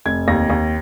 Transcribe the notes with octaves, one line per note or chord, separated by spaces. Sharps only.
F1 G#6
D#2 A#6
D#2